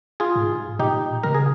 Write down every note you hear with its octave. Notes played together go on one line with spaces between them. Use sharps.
F4 G#4
G#2
A#2 D#4 G4
C#3 A#4
G#4